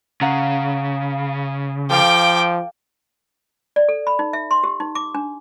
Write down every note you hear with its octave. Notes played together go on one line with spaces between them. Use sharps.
C#3 F5 F#5 A#5
F3 A4 F5 G5 D6
D5
A4
B5
D#4
E5
C6
G4
D#4
D6
D4